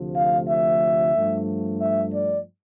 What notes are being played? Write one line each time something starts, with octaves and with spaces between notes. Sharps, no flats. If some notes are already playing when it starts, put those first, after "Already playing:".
Already playing: D2 C3 F3 A3
F5
E5
G2 F3 A3
E5
D5